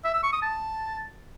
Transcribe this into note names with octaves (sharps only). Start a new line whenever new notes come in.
E5
E6
C#6
D#6
A5